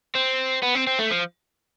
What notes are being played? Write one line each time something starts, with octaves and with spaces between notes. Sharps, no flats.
C4
B3
C4
C4
A3
F3